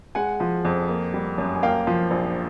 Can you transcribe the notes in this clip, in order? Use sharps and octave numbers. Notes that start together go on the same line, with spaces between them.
G#3 F#5 G#5
F3
F2
A#3
G3
F#2
G#5
A#3 F5 G5
F3
A#1